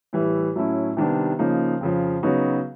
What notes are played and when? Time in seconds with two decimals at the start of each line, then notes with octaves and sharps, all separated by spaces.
0.13 A2 E3 G3
0.56 A2 F#3 A3 C#4 E4
0.97 C3 D#3 G3 B3 D4
1.39 C#3 F3 A#3 D#4
1.81 F2 C#3 F3
2.23 C#3 F#3 B3 D#4 F#4